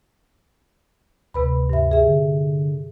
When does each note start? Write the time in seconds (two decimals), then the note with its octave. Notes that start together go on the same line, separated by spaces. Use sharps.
1.34 D2 C3 B4 B5
1.70 G2 E5
1.91 G#4 E5
2.07 D3